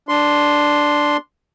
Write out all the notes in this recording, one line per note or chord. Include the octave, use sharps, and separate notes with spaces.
D4 C6